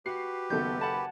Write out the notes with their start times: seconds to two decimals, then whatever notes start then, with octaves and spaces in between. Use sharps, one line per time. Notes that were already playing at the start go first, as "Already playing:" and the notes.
0.06 F#4 G4 B4 C7
0.50 F#1 D#3 B3 A4 G6
0.81 F#5 G#5 A5 B5